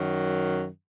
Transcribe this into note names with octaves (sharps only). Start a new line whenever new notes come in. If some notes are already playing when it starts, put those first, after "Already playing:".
Already playing: F#2 D#3 F#3